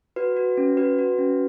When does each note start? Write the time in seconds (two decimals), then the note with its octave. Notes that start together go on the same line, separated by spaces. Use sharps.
0.16 F#4 B4
0.37 F#4
0.57 C#4
0.77 F#4 B4
0.99 F#4
1.18 C#4